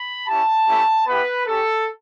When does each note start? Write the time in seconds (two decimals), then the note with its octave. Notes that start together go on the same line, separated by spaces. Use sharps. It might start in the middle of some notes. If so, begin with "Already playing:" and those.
Already playing: B5
0.27 C#4 E4 G4 A5
0.67 A3 C#4 E4 G4
1.07 B3 E4 G4 B4
1.46 C#4 G4 A4